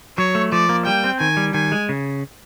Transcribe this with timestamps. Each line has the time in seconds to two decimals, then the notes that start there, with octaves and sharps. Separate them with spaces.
0.18 F#3 C#5
0.35 A3
0.52 F3 D5
0.69 A#3
0.86 G3 G5
1.04 C4
1.20 D#3 G#5
1.37 G3
1.54 D#3 G#5
1.72 G#3
1.89 C#3